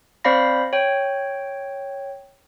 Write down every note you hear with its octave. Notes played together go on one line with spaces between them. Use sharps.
C4 C5 D5 F5 B5 A#6
C#5 G5